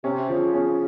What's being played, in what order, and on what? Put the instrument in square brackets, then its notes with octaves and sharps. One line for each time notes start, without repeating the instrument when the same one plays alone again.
[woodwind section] C3 [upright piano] C#4
[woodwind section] C#3 [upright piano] F3
[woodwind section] C#3 [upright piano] C#4